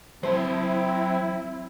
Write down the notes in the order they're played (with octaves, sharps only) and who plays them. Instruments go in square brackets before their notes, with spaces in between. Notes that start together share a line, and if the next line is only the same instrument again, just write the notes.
[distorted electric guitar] F#3 A5 [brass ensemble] C4 [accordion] E4 [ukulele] C5